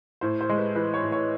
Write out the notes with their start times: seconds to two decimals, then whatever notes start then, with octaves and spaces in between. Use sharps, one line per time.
0.21 A2 C5
0.41 C5
0.49 G#3
0.58 B4
0.75 E3 B4
0.94 C#5
1.03 A2
1.12 C#5